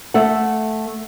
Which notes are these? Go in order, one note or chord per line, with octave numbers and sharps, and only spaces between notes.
A3 A4 F#5